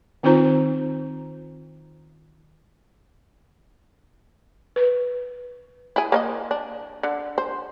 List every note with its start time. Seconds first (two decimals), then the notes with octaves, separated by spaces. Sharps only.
0.23 D#3 C4 D#4 F4 C5 A#5
4.76 B4
5.96 E4 G#4
6.12 A#3 C#5 D#5
6.51 D4
7.03 D3
7.38 C5